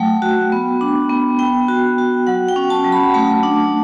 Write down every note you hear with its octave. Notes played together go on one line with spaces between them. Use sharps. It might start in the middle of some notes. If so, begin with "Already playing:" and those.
Already playing: F#3 A3 G5
F#4
B3
D4
B3
B3 G5
F#4
F#4
F#3 F#5
G5
C#4
A5
F#3
B5
A3 A5
D4